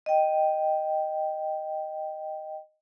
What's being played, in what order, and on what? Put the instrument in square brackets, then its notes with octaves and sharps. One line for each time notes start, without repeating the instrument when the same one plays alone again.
[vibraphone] D#5 G5